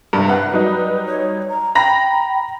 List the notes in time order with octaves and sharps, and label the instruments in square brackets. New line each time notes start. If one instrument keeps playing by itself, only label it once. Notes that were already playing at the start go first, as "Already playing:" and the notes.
[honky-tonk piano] G2 C3
[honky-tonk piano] C2 F#5 [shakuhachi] B4
[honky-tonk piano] F#3 G3 D#4
[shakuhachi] C#5
A#5
[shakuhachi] G5 [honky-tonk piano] A#5 B5 A#6